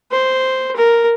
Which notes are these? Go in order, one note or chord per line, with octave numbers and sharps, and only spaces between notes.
C5
A#4